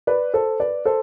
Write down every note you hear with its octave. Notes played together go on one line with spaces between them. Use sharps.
B4 D5
A4 C5
B4 D5
A4 C5